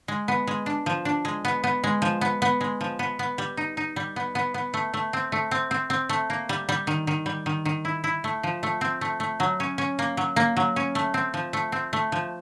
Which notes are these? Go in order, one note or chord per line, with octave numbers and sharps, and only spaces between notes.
G#3
B3
G#3
D4
F3
D4
G#3
B3
B3
G#3
F3
B3
B3
G#3
F3
B3
B3
G3
D#4
D#4
G3
B3
B3
B3
A3
A3
C4
A3
C4
C4
C4
A3
A#3
G3
G3
D#3
D#3
G3
D#3
D#3
E4
E4
A3
F3
A3
C4
A3
A3
F#3
C#4
C#4
A#3
F#3
A#3
F#3
C#4
A3
C4
F3
A3
C4
A3
F3